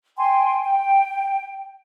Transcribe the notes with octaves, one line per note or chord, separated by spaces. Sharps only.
G5 G#5 C6
G5